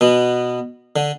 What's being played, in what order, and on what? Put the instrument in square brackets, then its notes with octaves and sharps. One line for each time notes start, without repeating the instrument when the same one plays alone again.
[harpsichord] B2 B3
D3